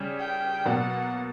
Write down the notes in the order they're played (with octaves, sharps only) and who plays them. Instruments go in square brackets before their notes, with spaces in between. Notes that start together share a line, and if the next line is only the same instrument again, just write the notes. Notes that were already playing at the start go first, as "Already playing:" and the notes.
Already playing: [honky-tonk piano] C#3 G3 C#4
[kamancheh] G5
[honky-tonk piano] B2 F#3 A#3 [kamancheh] F#5